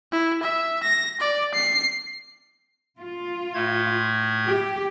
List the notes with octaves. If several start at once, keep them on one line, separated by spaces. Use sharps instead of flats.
E4
E5
A#6
D5
C7
F4
A2 A3 G#6
G4